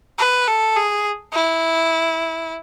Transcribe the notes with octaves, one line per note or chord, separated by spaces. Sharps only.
B4
A4
G#4
E4